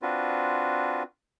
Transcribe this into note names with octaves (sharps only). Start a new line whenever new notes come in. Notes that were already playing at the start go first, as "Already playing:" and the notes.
C4 D4 F4 F#4 B4